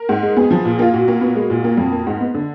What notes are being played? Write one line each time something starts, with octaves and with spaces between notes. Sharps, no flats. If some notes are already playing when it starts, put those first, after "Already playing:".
Already playing: A#4
G#2
G#3
B3 G#4
F3
A#2
A#3 F4
A#2 F#4
A#3
B3
G#3
A#2
A#3
F2
A#3
G#2
B3
D3